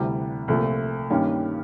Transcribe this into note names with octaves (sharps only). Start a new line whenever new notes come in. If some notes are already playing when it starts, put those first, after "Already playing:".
Already playing: D2 C3 E3 G3
C2 A#2 F3 A3
G2 D#3 G3 A#3 C#4